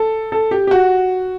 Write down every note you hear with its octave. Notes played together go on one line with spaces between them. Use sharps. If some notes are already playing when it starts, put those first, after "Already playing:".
Already playing: A4
A4
G4
G4
F#4